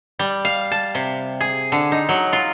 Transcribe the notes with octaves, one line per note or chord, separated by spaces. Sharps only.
G3
F5
A5
C3
G#4
D3
D#4
F#3
F4